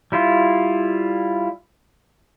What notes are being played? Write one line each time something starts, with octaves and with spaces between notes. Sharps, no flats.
G3 E4 F4